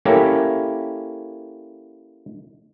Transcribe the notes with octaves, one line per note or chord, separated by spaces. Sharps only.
A#3 C#4 E4 G4 A4